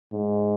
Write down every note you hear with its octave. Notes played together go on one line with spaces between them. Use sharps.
G#2